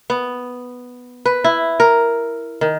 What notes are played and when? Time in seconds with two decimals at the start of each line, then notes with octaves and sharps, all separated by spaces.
0.10 B3
1.26 B4
1.44 E4
1.80 A#4
2.61 D#3